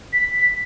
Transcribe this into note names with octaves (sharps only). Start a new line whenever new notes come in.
B6